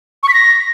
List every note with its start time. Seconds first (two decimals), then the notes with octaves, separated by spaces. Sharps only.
0.23 C#6
0.28 B6
0.34 A#6